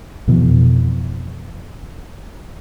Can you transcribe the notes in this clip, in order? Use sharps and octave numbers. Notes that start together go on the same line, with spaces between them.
F2 B2 E3